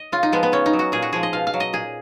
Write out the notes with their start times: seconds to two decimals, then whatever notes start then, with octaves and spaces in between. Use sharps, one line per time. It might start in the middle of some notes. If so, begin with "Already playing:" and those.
Already playing: D#5
0.12 C#3 F4
0.23 D#4
0.32 F3 G#3 B3
0.43 B3
0.52 C#3 C#4
0.66 D#4
0.73 F#3
0.79 F#4
0.92 A#2 G#4
1.02 F#4
1.13 F3 G#3 G#4
1.23 D#5
1.33 B2 F5
1.47 F5
1.54 F#3
1.60 D#5
1.73 A#2 G#4